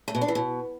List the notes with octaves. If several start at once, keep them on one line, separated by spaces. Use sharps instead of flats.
A3
B2
D4
E3
B2